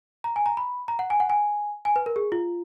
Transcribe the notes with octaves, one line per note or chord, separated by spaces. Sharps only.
A#5
G#5
A#5
B5
A#5
F#5
G#5
F#5
G#5
G#5
B4
A#4
G#4
F4